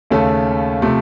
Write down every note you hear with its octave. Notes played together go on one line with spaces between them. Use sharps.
D#2 C#3 A3 C#4 A4
C3 F3 A3